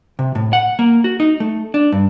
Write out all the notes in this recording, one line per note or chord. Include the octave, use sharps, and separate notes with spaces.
C3
A2
F#5
A#3
F#4
D#4
A3
D4
G2